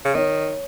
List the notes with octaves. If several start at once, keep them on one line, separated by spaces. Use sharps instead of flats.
C#3
D#3 C#5